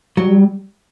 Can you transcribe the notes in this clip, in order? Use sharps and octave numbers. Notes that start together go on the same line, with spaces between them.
F#3 G3